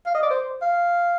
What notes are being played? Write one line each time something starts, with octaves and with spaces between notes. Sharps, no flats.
F5
D#5
D5
C5
F5